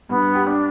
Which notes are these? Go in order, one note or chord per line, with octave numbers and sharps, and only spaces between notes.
G2 B3
G4
D4